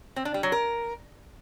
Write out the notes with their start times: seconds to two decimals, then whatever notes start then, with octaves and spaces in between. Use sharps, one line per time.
0.16 C4
0.25 D4
0.34 G3
0.43 F#3
0.52 A#4